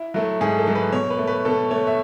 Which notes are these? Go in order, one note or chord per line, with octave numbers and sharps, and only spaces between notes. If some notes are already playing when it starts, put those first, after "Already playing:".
Already playing: E4
F#3 A3 E4
G#2 G#4
A4
F#3 A3
B4
B2 C#5
B4
A3
B4
B2 A4
A3 C#5
E5